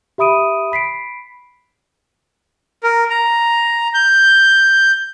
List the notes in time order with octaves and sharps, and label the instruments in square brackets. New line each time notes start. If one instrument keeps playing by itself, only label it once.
[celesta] G4 E5 B5 D#6 D7 D#7
B5 B6 C7 D7
[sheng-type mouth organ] A#4
A#5
G6